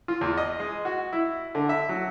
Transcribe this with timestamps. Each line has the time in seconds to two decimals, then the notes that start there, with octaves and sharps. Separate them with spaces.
0.08 F4
0.21 E2
0.37 D#5
0.60 G#3
0.85 F#4
1.13 E4
1.55 D3
1.69 E5
1.89 F#3